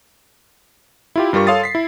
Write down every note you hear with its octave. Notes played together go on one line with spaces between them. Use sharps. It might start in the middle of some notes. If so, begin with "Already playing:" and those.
E4 F4 G4
G2 G3 F4 A#4 C#6
A4 C#5 F5 C6 D#6 A6
B6 C7
E4